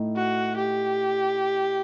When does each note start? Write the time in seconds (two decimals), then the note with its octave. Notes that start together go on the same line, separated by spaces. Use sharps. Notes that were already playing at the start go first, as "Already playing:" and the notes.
Already playing: A2 A3 D#4
0.16 F#4
0.57 G4